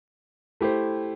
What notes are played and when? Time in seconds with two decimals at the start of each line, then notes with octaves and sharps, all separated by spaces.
0.61 A3 E4 G4 C5